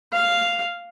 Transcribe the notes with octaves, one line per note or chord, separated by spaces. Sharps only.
F5